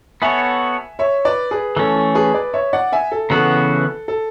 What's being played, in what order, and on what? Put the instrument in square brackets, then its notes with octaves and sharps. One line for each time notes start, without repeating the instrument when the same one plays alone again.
[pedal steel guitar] B3 F#4 A4 C#5 [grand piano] E5 G#5
[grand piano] C#5 E5
B4 D5
G#4 B4
[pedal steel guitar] E3 A3 C#4 [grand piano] A4
[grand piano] A4
G#4 B4
B4 D5
C#5 E5
D5 F#5
E5 G#5
A4
[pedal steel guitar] C#3 E3 B3 F#4 [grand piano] A4
[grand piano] A4